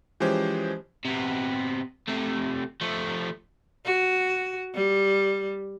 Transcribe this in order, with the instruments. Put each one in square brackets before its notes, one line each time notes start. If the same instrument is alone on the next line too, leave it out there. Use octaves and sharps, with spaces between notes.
[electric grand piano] E3 F3 G#3 C#4 G4 C5
[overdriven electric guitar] C3 B3
C3 A3
F3 A3
[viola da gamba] F#4
G3